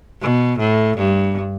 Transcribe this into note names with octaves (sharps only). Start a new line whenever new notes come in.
B2
A2
G2